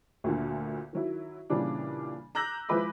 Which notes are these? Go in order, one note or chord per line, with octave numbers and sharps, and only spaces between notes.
D2 A#2 D3
D#3 F#3 E4
A#2 C#3 E3 G3 D4
A#5 D6 E6 F#6 G6 A#6
F3 G#3 E4 B4 B5 D6